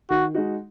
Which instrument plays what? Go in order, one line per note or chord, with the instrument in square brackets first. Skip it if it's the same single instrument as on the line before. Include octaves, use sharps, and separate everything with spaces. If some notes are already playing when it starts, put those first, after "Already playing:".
[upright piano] D#3 [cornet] F#4
[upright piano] G#3 D#4 F#4